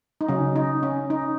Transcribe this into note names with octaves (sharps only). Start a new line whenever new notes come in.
D#4
C#3 F#3 C#4
D#4
C#4
D#4